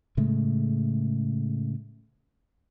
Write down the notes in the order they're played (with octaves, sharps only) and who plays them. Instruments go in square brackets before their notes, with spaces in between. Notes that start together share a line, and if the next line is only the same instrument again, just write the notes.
[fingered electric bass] A2 C#3 G#3 A3